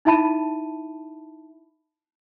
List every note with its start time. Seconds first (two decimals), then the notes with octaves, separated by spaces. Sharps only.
0.05 D#4 E4 E5 A5 B5 D#7